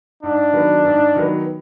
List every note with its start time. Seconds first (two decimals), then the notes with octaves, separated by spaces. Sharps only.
0.23 G#2 D4
0.53 D#3 F#3 B3
0.85 G#2
1.15 D#3 F#3 B3